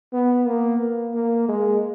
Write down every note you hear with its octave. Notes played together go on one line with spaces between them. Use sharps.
B3
A#3
A#3
G#3